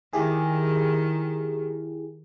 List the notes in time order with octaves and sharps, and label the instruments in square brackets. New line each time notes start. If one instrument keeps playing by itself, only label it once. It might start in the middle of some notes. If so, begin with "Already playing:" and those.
[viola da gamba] D#3 [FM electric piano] E4 G4 G#4